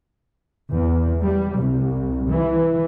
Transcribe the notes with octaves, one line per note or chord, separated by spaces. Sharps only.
E2
G3
C2
E3